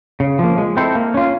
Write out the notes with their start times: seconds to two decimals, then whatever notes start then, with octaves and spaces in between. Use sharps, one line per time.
0.20 C#3
0.39 F3 A#3
0.58 G#3
0.77 C4 E4 A4 C5
0.95 A#3
1.14 C#4 F4